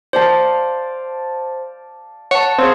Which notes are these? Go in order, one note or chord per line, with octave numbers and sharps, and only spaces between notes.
C5 D5 F5 A5
C#5 F#5 A5
C4 G#4 C#5 F5